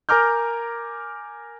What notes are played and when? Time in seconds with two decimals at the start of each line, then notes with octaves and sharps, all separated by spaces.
0.09 A#4 G#5 A#5 D6 F6 G6